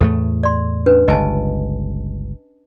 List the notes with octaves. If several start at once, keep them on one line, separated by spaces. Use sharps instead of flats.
E2 A2 A3 A4
D5 C6
C#4 D4 B4
G1 C#2 D#5 G#5 A5